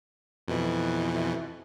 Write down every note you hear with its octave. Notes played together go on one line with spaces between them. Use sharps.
F2 B2 E3